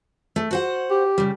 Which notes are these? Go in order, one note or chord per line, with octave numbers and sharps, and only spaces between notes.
A3
F#4 C5 F#5
G4
C#3 G3